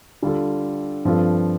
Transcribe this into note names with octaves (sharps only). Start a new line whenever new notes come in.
D3 G3 F4 A4
G2 F3 C4 F4 A4